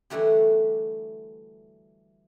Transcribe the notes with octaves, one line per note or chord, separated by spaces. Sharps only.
D3 E3 G3 A3 F#4 G4